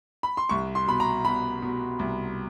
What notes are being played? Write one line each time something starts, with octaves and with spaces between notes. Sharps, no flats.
B5
C6
C2 C#6
C6
B2 B5
A#5
B2 B5
B2
C2